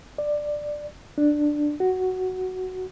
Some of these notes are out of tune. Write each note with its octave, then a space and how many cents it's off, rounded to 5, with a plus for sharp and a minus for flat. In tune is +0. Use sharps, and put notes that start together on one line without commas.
D5 +10
D4 +10
F#4 +5